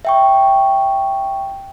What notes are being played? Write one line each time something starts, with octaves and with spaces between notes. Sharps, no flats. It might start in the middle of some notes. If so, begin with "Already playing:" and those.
E5 G5 C#6